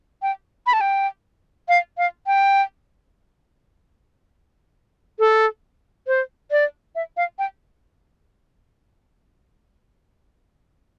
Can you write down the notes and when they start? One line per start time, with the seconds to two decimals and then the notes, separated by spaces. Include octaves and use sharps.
0.22 G5
0.67 B5
0.73 A5
0.81 G5
1.68 F5
1.98 F5
2.27 G5
5.19 A4
6.07 C5
6.51 D5
6.95 E5
7.17 F5
7.39 G5